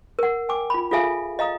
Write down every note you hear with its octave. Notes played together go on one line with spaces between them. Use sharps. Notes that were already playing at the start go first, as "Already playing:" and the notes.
A#4 F#5
G5 G#5 D6
F4 B5
F4 G#4 A4 E5 F5 G#5
D#5 F5 A#5 D#6